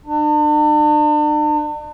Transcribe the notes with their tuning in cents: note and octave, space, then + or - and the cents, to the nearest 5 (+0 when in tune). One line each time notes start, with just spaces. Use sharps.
D4 +40